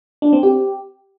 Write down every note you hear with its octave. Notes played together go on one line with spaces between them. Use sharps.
D4
C4
G4